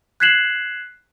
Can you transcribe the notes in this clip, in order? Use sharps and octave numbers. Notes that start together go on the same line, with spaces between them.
F#6 G#6 B6 C7 E7 F#7